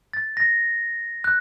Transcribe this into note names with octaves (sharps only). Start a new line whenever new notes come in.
A6
A#6
F#6